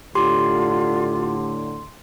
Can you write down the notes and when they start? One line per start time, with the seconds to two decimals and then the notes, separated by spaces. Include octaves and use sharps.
0.15 A2 D3 F4 G4 C6